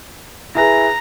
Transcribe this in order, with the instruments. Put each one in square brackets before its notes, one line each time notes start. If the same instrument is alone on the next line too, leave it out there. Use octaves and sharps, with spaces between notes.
[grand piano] E4 G#4 B4 [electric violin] A#5